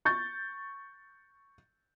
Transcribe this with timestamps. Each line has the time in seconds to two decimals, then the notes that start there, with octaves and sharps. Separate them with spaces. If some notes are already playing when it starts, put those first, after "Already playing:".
0.05 C#6 G6 A6